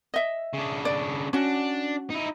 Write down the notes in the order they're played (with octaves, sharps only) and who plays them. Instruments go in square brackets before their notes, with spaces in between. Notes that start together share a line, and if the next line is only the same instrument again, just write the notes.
[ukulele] D#5 E5
[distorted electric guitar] C#3 D4
[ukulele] D5
[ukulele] C#4 F#4 [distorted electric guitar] D4
[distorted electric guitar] D#4 E4